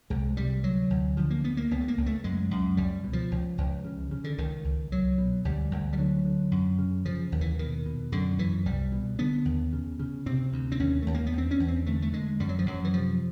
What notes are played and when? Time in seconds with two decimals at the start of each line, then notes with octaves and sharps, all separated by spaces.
0.10 C2 G#3
0.37 C3 G3
0.64 D2 F#3
0.90 D2
1.17 D3 F3
1.30 A#3
1.44 D2 B3
1.57 A#3
1.71 C#2 B3
1.81 A3
1.88 A#3
1.97 C#2
2.06 A3
2.24 F#2 G#3
2.51 F#2
2.77 C#2 G3
3.04 B2
3.13 F3
3.31 C#2
3.58 C#2
3.84 C#3
4.11 C#3
4.24 D3
4.38 C#2 D#3
4.64 C#2
4.91 C2 F#3
5.18 B2
5.45 D2 G3
5.71 D2
5.93 G3
5.98 D3 F#3
6.25 D3
6.51 F#2
6.78 C#3
7.05 C#3 F3
7.32 D#2
7.41 E3
7.59 B2 D#3
7.86 B2
8.12 F#2 D3
8.38 F#2 E3
8.66 C2 G3
8.92 B2
9.19 D3 B3
9.45 D#2
9.73 C#3
9.99 C#3
10.26 C3 C4
10.52 D2
10.72 C4
10.80 D#2 C#4
11.02 D#2 A3
11.15 A#3
11.26 B3
11.33 E2 C4
11.51 C#4
11.60 E2
11.68 C4
11.86 D3 A3
12.02 A3
12.13 D3 G#3
12.40 F#2 G3
12.49 F#3
12.59 F3
12.66 F#2 F#3
12.84 E3
12.93 C3 F3